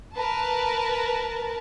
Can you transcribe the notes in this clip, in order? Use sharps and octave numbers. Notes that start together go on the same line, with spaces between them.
A#4 B4 A5